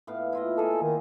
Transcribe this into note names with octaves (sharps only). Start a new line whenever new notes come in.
A2 B3 F5
E4 F4 D#5
A#3 G#4 A4
D#3